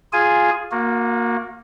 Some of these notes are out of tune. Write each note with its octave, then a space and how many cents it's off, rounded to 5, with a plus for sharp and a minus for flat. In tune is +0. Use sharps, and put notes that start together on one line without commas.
F4 +0 G#4 +0 G#5 +0
A#3 +0 F#4 -40